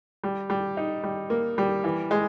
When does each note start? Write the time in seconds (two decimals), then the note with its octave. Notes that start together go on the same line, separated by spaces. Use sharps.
0.24 G3
0.50 G3
0.77 D#4
1.04 G3
1.30 A#3
1.58 G3
1.84 E3
2.11 G#3